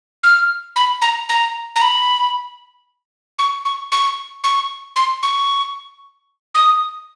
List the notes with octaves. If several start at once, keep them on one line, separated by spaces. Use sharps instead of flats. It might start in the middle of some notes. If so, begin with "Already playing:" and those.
F6
B5
A#5
A#5
A#5
B5
C#6
C#6
C#6
C#6
C6
C#6
D#6